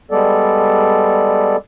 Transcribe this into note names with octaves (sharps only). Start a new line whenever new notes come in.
G3 G#3 B3 A4 D5